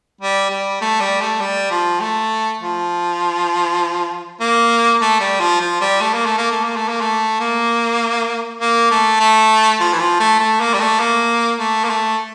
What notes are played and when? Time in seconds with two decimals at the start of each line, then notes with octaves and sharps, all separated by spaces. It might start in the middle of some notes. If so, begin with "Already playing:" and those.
0.21 G3
0.50 G3
0.81 A3
1.00 G3
1.21 A3
1.40 G3
1.71 F3
2.01 A3
2.61 F3
4.41 A#3
5.01 A3
5.20 G3
5.40 F3
5.61 F3
5.81 G3
6.01 A3
6.14 A#3
6.26 A3
6.38 A#3
6.52 A3
6.64 A#3
6.76 A3
6.89 A#3
7.01 A3
7.40 A#3
8.61 A#3
8.91 A3
9.20 A3
9.81 F3
9.93 E3
10.00 F3
10.20 A3
10.40 A3
10.61 A#3
10.74 G3
10.80 A3
11.00 A#3
11.60 A3
11.84 A#3
11.90 A3